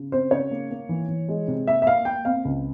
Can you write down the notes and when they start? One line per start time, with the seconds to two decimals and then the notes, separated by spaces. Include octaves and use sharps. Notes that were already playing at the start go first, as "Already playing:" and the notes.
Already playing: C#3
0.12 C4 C5
0.31 C#3 C#5
0.51 A#3
0.71 A#3
0.89 E3
1.09 E3
1.29 G#3
1.48 C3
1.67 A#3 E5
1.82 E5
1.86 A#3 F5
2.05 A#3 G5
2.25 C4 F5
2.45 C#2